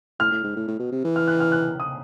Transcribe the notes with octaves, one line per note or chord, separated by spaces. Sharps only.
A2 F6
A2
G#2
A2
A2
B2
C3
E3
F6
F#6
F6
F#6
D#6